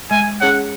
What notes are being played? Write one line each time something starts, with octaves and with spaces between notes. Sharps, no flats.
G#3 G#5
C#4 G#4 C#5 F#5